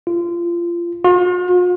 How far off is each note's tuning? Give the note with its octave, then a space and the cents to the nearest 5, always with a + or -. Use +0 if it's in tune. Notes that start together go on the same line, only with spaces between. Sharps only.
F4 -25
F4 +45